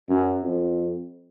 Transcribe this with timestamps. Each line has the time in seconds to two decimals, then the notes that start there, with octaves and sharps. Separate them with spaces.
0.09 F#2
0.43 F2